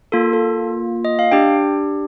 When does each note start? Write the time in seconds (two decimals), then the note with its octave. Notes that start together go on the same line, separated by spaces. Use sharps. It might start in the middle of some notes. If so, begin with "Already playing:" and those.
0.12 A#3 F4 A4
0.33 A4
1.05 D#5
1.19 F5
1.31 D4 G4 G5